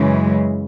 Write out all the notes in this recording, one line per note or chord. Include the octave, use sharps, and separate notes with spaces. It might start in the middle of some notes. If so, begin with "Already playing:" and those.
Already playing: F#2 C#3 E3 G#3